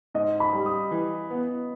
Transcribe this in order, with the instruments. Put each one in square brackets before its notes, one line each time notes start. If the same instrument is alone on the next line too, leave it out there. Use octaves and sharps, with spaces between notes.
[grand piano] G#2 [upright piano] D#5
[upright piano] B5
[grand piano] G3
[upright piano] D#6
[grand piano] E3
B3